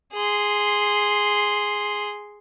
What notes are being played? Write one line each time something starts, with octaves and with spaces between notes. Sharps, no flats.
G#4 C6